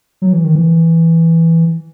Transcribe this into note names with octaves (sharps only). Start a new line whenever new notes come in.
F#3
E3
D#3
E3